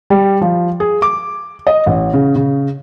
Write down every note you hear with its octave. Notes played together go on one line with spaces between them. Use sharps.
G3
F3
G#4
D6
D#5
A1
C#3
C#3